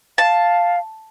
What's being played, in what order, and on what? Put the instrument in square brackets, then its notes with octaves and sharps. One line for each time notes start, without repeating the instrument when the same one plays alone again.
[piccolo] F5 [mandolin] A5